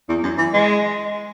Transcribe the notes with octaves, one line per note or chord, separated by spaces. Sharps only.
E2
F#2
E3
G#3